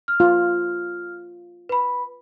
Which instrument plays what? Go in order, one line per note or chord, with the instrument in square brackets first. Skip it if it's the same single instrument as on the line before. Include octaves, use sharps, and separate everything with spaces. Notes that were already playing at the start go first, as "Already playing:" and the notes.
[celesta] F6
[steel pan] F4
[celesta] B4 B5